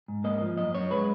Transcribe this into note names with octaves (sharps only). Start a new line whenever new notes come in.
G#2
A#3 D#5
F3
F#2 D#5
F#2 C#5
G#3 B4